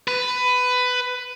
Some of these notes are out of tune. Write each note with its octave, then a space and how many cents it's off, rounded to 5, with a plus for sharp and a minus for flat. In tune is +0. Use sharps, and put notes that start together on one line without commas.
B4 +15